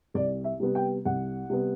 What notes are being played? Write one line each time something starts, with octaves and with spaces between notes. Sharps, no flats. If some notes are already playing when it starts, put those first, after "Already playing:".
C2 D5
E5
C3 G3 B3
G5
C2 F#5
C3 G3 B3